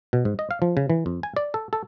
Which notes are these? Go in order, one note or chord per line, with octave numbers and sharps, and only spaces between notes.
B2
G#2
D#5
F5
F3
C#3
E3
F2
G#5
D5
A4
A4